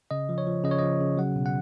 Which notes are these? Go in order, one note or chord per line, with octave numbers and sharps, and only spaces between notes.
C#3 D#5
F3
C#5
F3
C#3 D#5
C#5
F3 D#5
C#3
F#3 F#5
B2
F#5